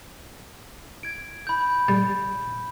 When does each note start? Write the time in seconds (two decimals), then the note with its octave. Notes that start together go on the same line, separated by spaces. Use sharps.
1.03 G#6 D7
1.47 B5 G6
1.88 G3